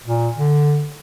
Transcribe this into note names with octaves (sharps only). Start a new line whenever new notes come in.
A#2
D3